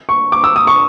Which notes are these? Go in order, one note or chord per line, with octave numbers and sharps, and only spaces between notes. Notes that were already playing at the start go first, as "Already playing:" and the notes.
C#6
D6
E6
D#6
C#6